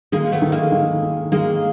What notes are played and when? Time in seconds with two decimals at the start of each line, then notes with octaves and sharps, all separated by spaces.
0.12 D#3 G#3 A#3
0.32 A3 B3
0.42 D#3
0.52 G#3 A#3
0.72 D#3
1.03 D#4
1.32 D#3 G#3 A#3